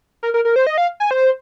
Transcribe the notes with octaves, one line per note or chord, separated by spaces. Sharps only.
A#4
A#4
A#4
C5
D#5
F5
G#5
C5